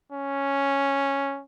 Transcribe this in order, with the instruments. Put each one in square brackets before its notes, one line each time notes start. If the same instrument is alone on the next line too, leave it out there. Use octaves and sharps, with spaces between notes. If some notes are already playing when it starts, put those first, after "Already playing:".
[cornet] C#4